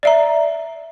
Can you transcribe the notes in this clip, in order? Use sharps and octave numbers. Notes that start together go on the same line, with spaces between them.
D5 E5 A#5